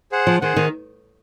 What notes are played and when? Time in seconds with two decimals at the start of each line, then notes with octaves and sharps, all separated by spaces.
0.12 G#4 C5 F#5
0.27 F3
0.41 D#3 G#4 C5 F#5
0.56 D#3